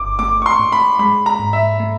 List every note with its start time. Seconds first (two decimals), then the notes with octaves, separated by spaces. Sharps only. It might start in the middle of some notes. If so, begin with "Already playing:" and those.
Already playing: G1 D6
0.19 A3 D6
0.42 C#6
0.46 C6
0.59 A2
0.72 B5
0.99 G#3 B5
1.26 A#5
1.39 G#2
1.53 E5
1.80 A3